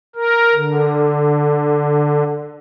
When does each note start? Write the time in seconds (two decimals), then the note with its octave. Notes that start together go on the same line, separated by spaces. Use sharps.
0.15 A#4
0.55 D3